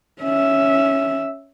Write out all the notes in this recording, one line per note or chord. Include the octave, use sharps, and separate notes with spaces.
C#4 E5